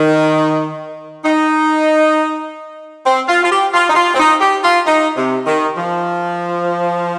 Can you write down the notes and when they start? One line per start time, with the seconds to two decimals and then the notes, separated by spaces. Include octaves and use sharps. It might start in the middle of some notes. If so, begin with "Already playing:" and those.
Already playing: D#3
1.24 D#4
3.05 C4
3.28 F4
3.43 F4
3.51 G4
3.73 F4
3.89 D#4
3.95 F4
4.14 C4
4.19 D#4
4.41 G4
4.63 F4
4.87 D#4
5.17 C3
5.46 D#3
5.77 F3